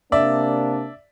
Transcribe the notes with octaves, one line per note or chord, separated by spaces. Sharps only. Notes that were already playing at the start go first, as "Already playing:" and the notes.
C3 A#3 D4 D5 E5